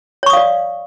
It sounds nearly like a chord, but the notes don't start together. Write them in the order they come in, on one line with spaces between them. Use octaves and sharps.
C#5 C#6 D#6 F5 D5